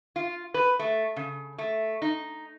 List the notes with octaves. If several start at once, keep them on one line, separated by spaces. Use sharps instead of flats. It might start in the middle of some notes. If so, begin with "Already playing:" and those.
F4
B4
A3
C#3
A3
D#4